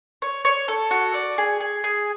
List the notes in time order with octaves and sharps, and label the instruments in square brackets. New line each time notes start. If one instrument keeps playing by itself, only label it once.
[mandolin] C#5
C#5
A4
F#4
D5
G#4
G#4
G#4